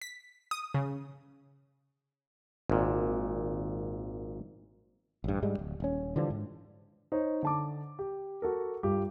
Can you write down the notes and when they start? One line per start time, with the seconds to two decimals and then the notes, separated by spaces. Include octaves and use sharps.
0.02 B6
0.51 D#6
0.74 C#3
2.70 G#1 A#2
5.24 A1 G2
5.42 G#2 G3 G#3
5.59 D1
5.80 D#1 C#4
6.16 D3 E3 F3 G3
6.30 G#2
7.12 D#4 C5 C#5
7.42 D3 A5 D6
7.99 G4
8.42 F#4 A4 A#4
8.83 G2 F4 G4